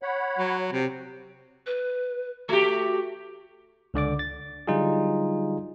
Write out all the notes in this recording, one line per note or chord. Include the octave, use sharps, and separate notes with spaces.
C#5 F#5 B5
F#3
C3
B4
A3 F#4 G4
C#2 D3 D5 D6
A6
D3 F#3 G3 D#4 F4 G#4